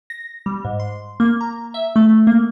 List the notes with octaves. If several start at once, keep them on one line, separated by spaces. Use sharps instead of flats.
A#6
G3
G#2
C6
A#3
A#5
E5
A3
A#3